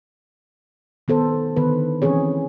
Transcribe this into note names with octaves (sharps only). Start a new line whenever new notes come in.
D#3 B3 A4 C5
D3 D#3 B3 B4
E3 C4 C#4 G#4 C#5